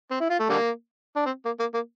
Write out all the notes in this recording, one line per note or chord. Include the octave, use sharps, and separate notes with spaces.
C4
E4
F4
A3
D3 G3 A#3
D4
C4
A#3
A#3
A#3